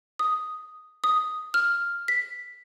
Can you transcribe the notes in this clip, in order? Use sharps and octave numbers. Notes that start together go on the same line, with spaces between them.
D#6
D#6
F6
B6